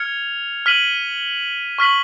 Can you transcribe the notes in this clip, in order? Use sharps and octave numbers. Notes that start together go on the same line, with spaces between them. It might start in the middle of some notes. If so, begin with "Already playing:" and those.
Already playing: F6 G#6 C#7 F7
F6 B6 D#7 F#7
C#6 F6 B6 F#7